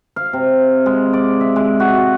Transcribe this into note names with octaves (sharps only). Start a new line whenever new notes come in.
F5
C3
G#3
D5
E5
G#3
F#4